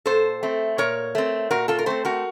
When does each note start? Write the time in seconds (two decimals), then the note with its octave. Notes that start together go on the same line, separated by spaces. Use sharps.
0.06 A#2 A4 C5
0.43 A3 C4
0.78 A#2 A#4 C#5
1.15 A3 C4
1.51 A#2 F#4 A#4
1.68 F4 A4
1.79 A#4
1.86 A3 C4 A4 C5
2.05 F#4 A#4